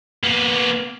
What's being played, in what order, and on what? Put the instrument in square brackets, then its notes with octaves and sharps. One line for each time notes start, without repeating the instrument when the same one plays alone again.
[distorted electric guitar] A#3 B3